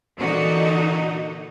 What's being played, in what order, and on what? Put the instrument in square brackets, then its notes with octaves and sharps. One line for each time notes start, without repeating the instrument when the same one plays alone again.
[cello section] A#2 D3 E3 D#4 F#4